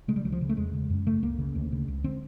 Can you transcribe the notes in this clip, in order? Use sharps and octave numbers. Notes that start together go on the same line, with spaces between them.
C#3 G#3
G3
C#2 F#3
F3
C#3
A3
E2 G#3
C#3
F#2
C#3 A3
C#2 A#3
C#3
D2
C#3
C#2
D3 C4